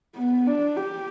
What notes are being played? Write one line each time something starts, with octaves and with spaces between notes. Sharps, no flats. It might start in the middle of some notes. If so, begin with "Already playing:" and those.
B3
D4
G4